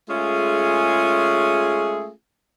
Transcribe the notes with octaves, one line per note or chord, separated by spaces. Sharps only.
G#3 A3 C#4 F4 G#4